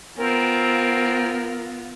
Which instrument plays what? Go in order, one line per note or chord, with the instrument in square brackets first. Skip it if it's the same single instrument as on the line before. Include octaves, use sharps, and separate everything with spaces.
[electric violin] B3 F4 [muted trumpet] C4 [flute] A#4